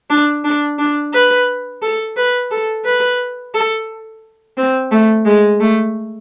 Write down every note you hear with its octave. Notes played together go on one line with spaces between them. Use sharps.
D4
D4
D4
B4
A4
B4
A4
B4
A4
C4
A3
G#3
A3